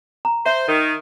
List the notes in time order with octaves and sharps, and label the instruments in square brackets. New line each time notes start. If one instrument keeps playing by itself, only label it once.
[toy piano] A#5
[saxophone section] C5 [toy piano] E5
[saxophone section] D#3